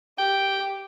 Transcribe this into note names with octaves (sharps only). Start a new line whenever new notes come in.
G4 G5